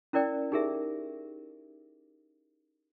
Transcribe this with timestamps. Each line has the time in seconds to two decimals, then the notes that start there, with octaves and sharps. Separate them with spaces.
0.13 C#4 E4 A#4 D5 G5
0.52 D#4 G4 G#4 A#4 E5